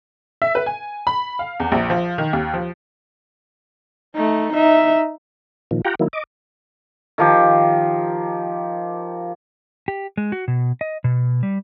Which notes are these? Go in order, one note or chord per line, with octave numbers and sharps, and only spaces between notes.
E5
B4
G#5
B5
F5
E2
A#1
F3
D#3
D#2
F3
A3 D#4
D#4 E5
A#2 D#3 F3
F4 G4 F#5 G5 A#5
D#3 F#3 A#3 E4
D#5 D6
D#3 F3 G4
G4
G#3
F#4
B2
D#5
B2
G3